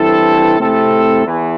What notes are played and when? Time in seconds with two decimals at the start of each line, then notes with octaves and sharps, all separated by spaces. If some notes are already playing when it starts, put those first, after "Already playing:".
Already playing: G2 E3 C4 E4 A4
0.59 C3 A3 C4 E4 A4
1.26 E2 E3